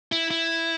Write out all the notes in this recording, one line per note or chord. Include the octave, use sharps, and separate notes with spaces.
E4
E4